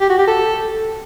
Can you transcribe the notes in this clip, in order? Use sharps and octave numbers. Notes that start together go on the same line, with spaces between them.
G4
F#4
G4
A4